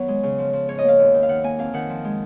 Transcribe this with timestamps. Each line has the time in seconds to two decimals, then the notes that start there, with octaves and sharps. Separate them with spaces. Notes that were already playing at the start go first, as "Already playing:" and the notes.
Already playing: D#3 F#3 B3 C#5
0.08 G#3
0.23 C#3
0.38 F3
0.53 F3
0.68 G#2 C#5
0.78 D#5
0.84 A#3 F5
0.99 D#2
1.14 D#3
1.23 F5
1.29 D#3 F#5
1.44 A#3 G#5
1.59 F2 F5
1.74 D#3 F#5
1.90 F3
2.05 G#3